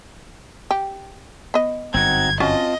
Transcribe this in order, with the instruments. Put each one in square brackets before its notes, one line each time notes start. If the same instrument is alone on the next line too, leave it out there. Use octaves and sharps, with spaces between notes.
[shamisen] G4
B3 D#5
[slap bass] G1 F#2 [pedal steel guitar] C4 D#4 F#4 [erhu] G#6
[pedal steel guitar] C4 F4 A5 [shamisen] C#4 F#4 [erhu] D#5